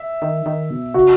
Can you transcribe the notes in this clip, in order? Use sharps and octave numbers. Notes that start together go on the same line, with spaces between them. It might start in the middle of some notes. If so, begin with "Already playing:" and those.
Already playing: E5
D#3
D#3
B2
C#3 F#4